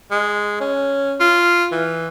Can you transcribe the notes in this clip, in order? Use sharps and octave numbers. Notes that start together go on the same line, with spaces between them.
G#3
C#4
F4
E3